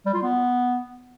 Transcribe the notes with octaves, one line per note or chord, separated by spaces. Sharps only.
G3
F4
B3